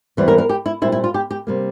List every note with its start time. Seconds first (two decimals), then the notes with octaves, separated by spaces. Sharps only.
0.17 E2 E3 G3 C4
0.28 A#4
0.38 A#4
0.49 G4
0.66 E4
0.82 A#2 G3 C4 E4
0.92 E4
1.04 F4
1.14 G4
1.31 G4
1.47 C3 G3 A#3